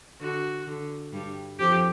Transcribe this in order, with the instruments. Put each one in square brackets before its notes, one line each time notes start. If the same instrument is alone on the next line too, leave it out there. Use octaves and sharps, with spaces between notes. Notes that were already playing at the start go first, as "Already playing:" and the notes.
[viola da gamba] D3 [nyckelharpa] F#4
[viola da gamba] D3
G2 G3
[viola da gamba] F2 F3 [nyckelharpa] G4